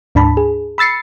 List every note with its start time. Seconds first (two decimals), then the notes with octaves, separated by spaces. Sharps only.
0.15 D2 G#2 D4 A5 B5
0.37 G#4
0.78 B5 E6 A6 C7 C#7